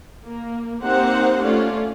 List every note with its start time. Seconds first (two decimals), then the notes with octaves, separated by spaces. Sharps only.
0.23 A#3
0.82 A#3 C4 D#4 G4 C5 F#5
1.42 A3 C#4 F4 D5